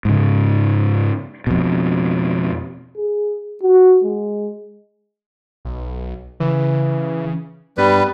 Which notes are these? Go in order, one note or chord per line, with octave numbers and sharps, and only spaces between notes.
G#2 C#3
F2 B2
G#4
F#4
G#3
B1
C#3 E3
G2 G3 B3 B4